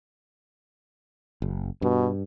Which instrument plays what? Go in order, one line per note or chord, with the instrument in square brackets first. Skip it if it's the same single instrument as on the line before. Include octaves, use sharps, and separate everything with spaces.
[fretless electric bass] F#1
[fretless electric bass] G2 [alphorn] B2